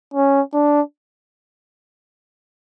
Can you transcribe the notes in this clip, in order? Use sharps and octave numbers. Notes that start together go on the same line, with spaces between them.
C#4
D4